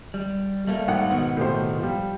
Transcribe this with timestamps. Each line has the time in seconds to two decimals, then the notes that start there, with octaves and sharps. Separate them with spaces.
0.14 G3
0.67 G3 A3 A#3
0.88 G#1 F#5
1.10 B2 D#3 B3
1.37 A2 C3 C5
1.79 F3 G3